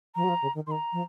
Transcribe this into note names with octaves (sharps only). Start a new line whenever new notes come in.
F3 A#5
F#3
F3
C#3
D#3
D#3 C6
A#5
F3